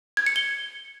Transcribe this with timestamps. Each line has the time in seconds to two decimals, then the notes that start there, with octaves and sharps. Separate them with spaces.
0.17 G#6
0.26 C#7
0.36 G7